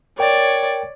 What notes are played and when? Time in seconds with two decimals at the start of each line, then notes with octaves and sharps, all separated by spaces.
0.19 A#4 C#5 D5 G5